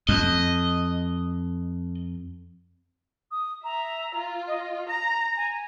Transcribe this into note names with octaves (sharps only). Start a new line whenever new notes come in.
F2 D#5
D#6
E5 A#5
F4
D#5
A#5 A#6
G#5